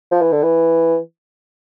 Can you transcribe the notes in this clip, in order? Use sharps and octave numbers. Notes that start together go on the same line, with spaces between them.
F3
E3
D3
E3